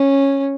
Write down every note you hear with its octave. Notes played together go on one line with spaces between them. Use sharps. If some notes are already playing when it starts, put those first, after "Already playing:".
Already playing: C#4